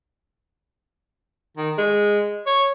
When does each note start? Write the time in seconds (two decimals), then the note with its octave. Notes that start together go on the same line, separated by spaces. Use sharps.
1.57 D#3
1.78 G#3
2.46 C#5